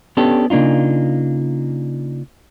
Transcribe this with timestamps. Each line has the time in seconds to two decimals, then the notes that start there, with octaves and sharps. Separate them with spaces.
0.17 B3 C#4 D4 G4 A4
0.50 C#3 A#3 D4 D#4 F4